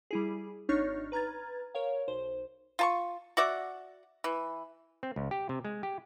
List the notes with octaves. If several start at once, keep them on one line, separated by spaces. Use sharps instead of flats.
G3 E4 G#4
G#1 D4 D#4 C#5 C#6 F6
B4 A#5 F6 G#6 A6
A#4 C#5 F5
B1 C5
F4 A5 C#6
F#4 D5 E5 F#5
E3
C4
C#2
G4
C3
G#3
G4